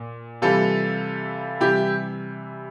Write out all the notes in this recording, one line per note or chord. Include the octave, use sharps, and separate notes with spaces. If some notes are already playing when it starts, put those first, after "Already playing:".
Already playing: A#2
C3 E3 G3 F4 A4
C3 E3 G3 E4 G4